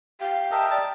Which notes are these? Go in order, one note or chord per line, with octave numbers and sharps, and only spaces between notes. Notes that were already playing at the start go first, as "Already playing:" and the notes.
G4 F5
A#4 D#5 E5 G5 A5
D5 A5